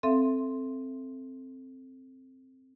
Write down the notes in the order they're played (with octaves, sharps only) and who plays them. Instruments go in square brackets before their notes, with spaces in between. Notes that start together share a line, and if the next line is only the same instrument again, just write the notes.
[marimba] C4 A4 E5 F5 C6